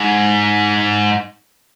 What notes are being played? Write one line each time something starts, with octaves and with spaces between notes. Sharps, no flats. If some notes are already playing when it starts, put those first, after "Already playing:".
Already playing: G#2